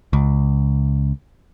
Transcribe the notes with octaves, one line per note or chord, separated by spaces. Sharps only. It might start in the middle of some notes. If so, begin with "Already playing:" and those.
C#2